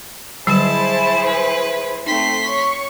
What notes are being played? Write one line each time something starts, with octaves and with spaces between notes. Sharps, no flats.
D3 F#3 G3 E4 G#4 C5 A5
B4
A3 C4 D#4 C6 B6
C#5 C#6